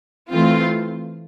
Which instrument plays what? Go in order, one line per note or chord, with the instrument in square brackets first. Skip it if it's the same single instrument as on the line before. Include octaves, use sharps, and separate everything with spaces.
[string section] E3 A3 C4 F4